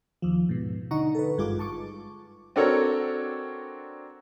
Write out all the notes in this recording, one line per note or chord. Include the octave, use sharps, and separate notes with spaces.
D#2 F3
G#2 B2
D3 D#4 F#5 A#5 C#6
A4 B4
G#1 G2 G#3 F4 D6
A5 C#6 D6
C4 D4 F#4 A4 A#4 C#5